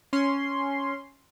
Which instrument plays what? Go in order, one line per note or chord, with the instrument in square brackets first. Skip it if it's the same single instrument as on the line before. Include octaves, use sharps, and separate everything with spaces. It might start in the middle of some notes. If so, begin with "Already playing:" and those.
[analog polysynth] C#4 C6